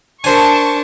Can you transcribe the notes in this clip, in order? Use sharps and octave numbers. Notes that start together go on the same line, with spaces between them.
D4 A#4 C5 G#5 A5 C#6